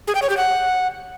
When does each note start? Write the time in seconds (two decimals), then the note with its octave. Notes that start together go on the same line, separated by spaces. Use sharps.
0.08 G#4
0.15 G5
0.22 C#5
0.30 G4
0.37 F#5